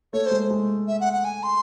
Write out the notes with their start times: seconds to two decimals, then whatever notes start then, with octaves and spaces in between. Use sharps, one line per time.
0.13 A3 C#5
0.26 C5
0.31 G#3
0.50 G#3
0.88 E5
1.00 F#5
1.13 F#5
1.24 G#5
1.43 C6